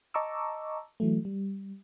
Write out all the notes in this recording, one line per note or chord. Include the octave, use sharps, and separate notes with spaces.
D#5 A5 A#5 C#6 D6 E6
E3 F#3 A3
G3